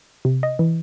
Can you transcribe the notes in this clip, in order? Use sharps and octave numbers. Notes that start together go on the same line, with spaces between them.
C3
D#5
E3